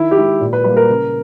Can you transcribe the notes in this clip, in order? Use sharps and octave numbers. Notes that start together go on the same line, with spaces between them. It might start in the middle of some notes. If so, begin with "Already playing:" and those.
Already playing: D#3 E4
G4
G#3 E4
A#2
B4
G3 A#3 B4
A#4
C#3